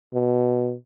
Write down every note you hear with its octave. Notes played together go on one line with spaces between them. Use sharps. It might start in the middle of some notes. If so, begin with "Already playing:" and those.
B2